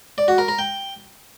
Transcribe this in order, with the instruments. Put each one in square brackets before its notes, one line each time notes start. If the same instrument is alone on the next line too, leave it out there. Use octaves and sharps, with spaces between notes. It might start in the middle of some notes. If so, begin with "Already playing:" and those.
[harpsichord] D5
F#4
A#4
A#4
G5